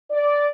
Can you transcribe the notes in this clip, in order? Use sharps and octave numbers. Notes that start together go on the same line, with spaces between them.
D5